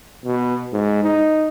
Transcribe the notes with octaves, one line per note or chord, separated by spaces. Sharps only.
B2
G#2
D#4